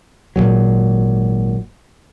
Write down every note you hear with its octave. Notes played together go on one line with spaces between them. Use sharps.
G#1 D#2 A#2 F#3